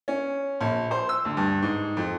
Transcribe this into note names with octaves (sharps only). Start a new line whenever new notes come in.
C#4
A#1
C5
E6
D2
G2
G#2
F2